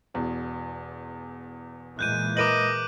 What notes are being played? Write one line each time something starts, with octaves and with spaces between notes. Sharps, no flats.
E1 E2
A#2 E3 G#3 F#6 G6 D#7
A#4 B4 D#5 D6 D7 D#7 F#7